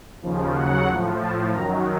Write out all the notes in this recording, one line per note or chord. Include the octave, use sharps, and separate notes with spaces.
D#2 C#3 F3
D#2 C#3 F#3 F#5
A2 F3
A2 F3 A5
F#2 D#3 F#3 A#5